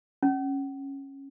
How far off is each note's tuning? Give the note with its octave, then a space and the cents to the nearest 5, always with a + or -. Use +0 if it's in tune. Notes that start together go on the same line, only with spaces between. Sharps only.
C#4 -15